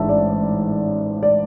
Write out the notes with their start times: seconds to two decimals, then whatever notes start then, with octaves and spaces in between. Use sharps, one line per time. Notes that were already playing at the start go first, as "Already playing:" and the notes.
Already playing: A1 G#2 G#3 D4 E5 A5
0.09 D5
1.23 D5